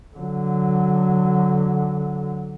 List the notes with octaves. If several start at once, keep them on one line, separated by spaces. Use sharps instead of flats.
D3 F#3